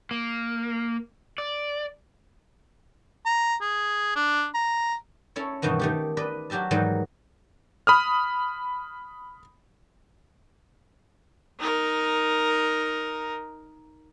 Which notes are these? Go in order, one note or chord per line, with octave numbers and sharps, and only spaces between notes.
A#3
D5
A#5
G#4
D4
A#5
C#4 E4 A4 C#5
G2 B2 D#3 E3 F#4
D#3 A3 G4
B4 D5 D#5
F#3 F#4 G4 E5 A5
G#2 D#3 E3 F#3 G3
B5 D#6 F6
D#4 A#4